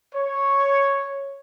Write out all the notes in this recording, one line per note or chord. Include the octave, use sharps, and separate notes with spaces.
C#5